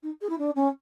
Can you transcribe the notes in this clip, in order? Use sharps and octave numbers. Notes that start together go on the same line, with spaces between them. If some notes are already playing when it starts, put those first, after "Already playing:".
D#4
G#4
E4
D4
C#4